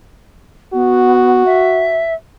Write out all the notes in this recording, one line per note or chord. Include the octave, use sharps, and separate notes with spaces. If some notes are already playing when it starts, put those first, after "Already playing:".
B3 F#4
E5